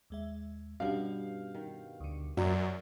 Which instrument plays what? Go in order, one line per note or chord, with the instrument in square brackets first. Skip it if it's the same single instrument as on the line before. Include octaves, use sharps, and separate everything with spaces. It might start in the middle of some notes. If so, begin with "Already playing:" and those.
[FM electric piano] D#2 G#3 E5
[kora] G2 B2 [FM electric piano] G3 C#4 [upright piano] F5
[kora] D#3
[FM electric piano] D2 D3
[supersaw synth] F#2 [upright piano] F#3 [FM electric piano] F#4 D5 E5